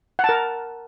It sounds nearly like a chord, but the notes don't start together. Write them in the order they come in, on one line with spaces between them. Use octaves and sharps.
F#5 A5 A#4